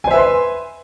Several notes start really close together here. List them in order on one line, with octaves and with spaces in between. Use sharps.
G#5 C5 E5 B4 C6